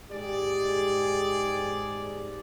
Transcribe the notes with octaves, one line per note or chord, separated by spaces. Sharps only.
G#2 G4 G#4 D5